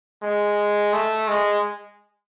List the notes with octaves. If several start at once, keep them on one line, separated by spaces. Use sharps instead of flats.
G#3
A3
G#3